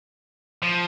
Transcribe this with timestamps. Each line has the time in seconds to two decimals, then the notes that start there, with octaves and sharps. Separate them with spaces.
0.63 F3